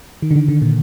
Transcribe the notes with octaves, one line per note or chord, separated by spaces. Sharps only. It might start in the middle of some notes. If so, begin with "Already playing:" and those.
D#3
D3
D#3
D3
A#2